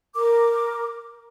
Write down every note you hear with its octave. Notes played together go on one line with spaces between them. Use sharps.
A#4 D6